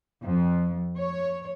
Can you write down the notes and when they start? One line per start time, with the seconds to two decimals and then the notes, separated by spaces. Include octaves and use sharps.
0.21 F2
0.96 C#5